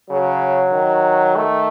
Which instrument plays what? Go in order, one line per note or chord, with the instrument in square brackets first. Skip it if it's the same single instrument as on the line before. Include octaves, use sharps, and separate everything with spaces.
[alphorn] C#3 [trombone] F#3
[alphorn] D#3
[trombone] A3